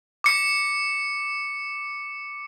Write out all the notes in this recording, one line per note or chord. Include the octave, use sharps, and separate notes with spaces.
D6 C#7